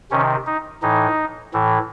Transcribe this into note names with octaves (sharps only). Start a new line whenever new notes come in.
C3 D#3 C#4
D#4
A2 E3 D#4
A2 E3